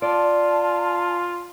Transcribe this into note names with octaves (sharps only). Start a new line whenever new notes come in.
F4 D5 A5